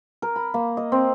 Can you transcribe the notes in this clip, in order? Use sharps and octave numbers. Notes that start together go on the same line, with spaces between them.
A#4
B5
A#3
D#5
C4